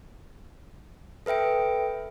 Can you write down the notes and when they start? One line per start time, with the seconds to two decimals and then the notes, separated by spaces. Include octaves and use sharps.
1.26 A4 B4 E5 G5 D7